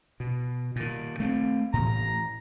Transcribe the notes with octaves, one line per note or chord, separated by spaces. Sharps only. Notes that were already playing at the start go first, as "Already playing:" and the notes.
B2
A#2 D#3
A3 C4
A2 E3 A#5